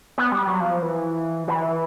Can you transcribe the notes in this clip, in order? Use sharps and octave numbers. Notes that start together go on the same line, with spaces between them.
B3
G3
F#3
F3
E3
E3